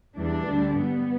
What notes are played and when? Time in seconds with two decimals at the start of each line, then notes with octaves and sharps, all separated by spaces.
0.16 E2 E3 G3 D4
0.46 D2 D3 G3
0.77 G2 G3 B3